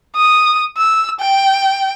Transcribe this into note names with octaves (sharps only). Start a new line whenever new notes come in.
D#6
E6
G5